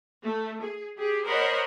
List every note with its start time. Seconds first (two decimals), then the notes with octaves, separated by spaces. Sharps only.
0.23 A3
0.63 G#4
0.97 G4 G#4
1.27 A#4 C5 C#5 D#5 F#5 B5